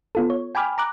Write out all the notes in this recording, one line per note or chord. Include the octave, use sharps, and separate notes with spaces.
B3 F4 A4
C#5
G5 G#5 B5 D6 F6
A#5 D6 F#6